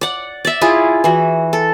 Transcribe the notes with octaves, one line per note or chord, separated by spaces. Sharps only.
D5 F#5
D5 E5
E4 F4 G#4
E3 F#4
A4